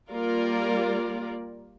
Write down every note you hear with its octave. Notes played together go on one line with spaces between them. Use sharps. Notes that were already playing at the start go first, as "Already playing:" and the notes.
G3 A#3 F4 A#4 D5